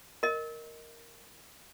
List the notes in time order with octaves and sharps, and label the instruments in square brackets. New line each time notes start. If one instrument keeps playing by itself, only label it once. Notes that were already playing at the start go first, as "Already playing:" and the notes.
[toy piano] A#4 D#5